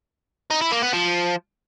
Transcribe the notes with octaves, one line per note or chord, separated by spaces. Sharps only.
D#4
E4
A#3
B3
F3